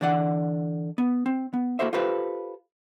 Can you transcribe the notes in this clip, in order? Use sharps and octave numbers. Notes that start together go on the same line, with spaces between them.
D3 E3 D5 F#5
B3
C4
B3
A#3 E4 F#4 A4 C5 E5
F4 G4 A4 B4 C5